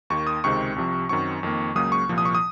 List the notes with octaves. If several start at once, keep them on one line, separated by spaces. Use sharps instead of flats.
D#2 D#3 A#3 C#6
D#6
C#2 C3 D#3 G#3 C4 C#6
C2 C3 F3
F#2 D#3 F#3 C4 C#6
F2 D#3 A#3
C#2 C#3 F#3 A#3 D#6
C#6
C2 A#2 F3
D#6
C#6
D#6